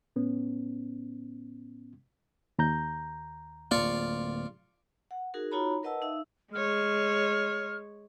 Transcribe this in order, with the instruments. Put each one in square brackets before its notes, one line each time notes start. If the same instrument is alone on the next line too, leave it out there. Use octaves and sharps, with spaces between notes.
[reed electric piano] A2 B3 C#4
D#2 A#5 G6
[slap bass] D1 A#3 [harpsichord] F4 D5 C#6
[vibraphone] F#5
D#4 F#4 G#4 A#4
D#4 F4 F#4 C#5 A#5 B5
A#4 B4 D#5 F#5 A5 E6
D#4 E5 F5 E6
[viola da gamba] G#3 C#5 [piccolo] F6